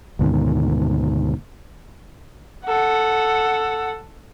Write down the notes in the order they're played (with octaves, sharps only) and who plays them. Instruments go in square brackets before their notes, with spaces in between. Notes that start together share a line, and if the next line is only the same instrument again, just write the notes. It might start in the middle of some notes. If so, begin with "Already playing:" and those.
[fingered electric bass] D2 G#2 B2 D#3
[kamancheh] A4 F#5